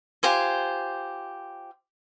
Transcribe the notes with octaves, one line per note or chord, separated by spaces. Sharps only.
F4 G4 C5 G#5